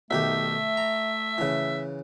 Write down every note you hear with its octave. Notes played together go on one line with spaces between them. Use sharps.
B1 D#3 A3 G4 E5
A#5
C#3 E3